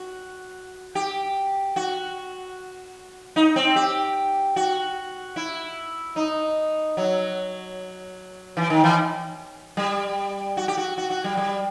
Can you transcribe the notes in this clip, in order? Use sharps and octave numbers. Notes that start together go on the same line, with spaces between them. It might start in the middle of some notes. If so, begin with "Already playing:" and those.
Already playing: F#4
G4
F#4
D#4
C4
G4
F#4
E4
D#4
F#3
E3
D#3
E3
G3
F#4
G4
F#4
F#4
F#4
G3
G3